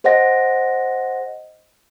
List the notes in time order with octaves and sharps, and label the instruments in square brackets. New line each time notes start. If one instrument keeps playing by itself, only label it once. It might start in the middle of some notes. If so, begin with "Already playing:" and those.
[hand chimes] G#4 C5 D#5 F#5 A#6